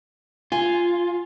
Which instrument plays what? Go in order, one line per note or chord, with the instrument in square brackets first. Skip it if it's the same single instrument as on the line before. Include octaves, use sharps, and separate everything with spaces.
[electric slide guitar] F4 [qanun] G#5